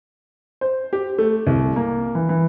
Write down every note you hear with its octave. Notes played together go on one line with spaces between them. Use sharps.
C5
G4
A3
C2
A#3
E3
E3